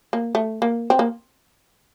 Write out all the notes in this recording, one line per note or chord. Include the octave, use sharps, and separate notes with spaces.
A#3
A3
A#3
C4
A#3